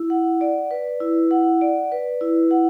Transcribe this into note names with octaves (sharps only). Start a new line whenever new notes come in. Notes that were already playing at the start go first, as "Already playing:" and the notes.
Already playing: E4
F#5
D5
B4
E4
F#5
D5
B4
E4
F#5